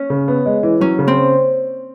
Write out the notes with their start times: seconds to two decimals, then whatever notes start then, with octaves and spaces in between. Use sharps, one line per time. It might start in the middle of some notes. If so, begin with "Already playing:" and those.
Already playing: C#4
0.10 C#3
0.28 B3
0.46 G#3
0.63 E3
0.80 F#3 C#4
0.99 C#3
1.08 C4